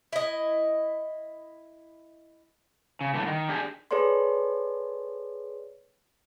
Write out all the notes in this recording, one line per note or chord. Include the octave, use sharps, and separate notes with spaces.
E4 D#5
C#3
G2 D3 E3 A3
D#3
D4 G4 G#4
G#4 A4 B4 C#5 D5 C6